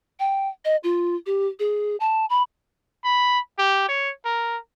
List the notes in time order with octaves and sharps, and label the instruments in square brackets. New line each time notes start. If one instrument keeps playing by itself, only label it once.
[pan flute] G5
D#5
F4
G4
G#4
A5
B5
[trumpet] B5
G4
C#5
A#4